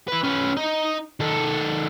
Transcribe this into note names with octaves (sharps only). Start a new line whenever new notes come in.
E4 B4
C#4 B4
D#4 D#5
D#3 A4